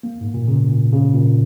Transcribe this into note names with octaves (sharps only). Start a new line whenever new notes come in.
A#3
G#2
A#2
C#3
A#2
C#3
A#2